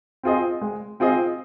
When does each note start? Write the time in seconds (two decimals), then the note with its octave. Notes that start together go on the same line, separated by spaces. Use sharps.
0.23 C4 F4 G#4 D#5
0.62 G#3
1.00 C4 F4 G#4 D#5